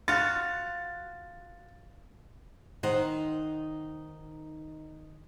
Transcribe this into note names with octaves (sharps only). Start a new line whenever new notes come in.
F4 F#4 A6
D#3 D#4 C5 F#5